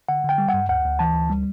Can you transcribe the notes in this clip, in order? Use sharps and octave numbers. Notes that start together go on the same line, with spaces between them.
D3 F#5
D3
G5
G3
F#5
G2
D2 F#5
D2
E3 A5
D2
G3